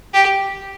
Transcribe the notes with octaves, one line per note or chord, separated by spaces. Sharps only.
G4